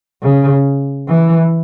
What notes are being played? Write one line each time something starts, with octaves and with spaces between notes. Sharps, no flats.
C#3
E3